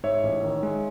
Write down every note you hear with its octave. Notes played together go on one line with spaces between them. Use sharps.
G#2 C#5 E5
A1
D#3
G#3